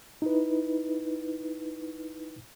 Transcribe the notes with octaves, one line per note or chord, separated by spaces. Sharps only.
D#4 E4 B4